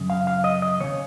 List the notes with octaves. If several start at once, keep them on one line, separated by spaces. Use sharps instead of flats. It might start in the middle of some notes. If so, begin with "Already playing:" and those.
Already playing: F#2 C#3
F5
F5
D#5
D#5
D#2 C#3 C#5